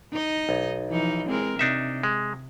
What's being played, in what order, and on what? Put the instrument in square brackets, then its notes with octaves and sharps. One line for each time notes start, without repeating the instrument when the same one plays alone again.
[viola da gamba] D#4 D#5
[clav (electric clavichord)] B1
[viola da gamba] E3 F3 D#4
G#3 C4 A#4
[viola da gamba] C3 [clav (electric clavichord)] D4 D#4 E5
[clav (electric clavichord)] G#3